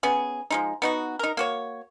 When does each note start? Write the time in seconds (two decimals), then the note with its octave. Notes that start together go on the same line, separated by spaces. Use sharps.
0.03 B3 C#4 G#4
0.50 F3 G#3 D#4
0.82 B3 D#4 F#4
1.19 D#4 A#4
1.37 A#3 F#4 C#5